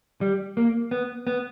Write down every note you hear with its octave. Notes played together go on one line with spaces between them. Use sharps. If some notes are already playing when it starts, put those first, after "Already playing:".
G3
A#3
B3
B3